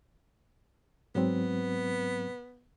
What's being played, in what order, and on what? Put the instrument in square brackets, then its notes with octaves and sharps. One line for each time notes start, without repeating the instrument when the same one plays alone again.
[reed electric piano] G#2 F#3 C4 [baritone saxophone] B3